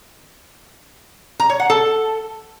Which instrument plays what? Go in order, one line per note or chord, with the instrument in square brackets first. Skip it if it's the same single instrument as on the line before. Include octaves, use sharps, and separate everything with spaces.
[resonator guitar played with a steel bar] A#5
C#5
F#5
A4